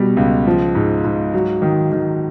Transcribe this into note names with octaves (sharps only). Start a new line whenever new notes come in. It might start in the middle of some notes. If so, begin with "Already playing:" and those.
Already playing: B2 G3
C#2
F3
G#2
G#2
F#3
D#3
D#3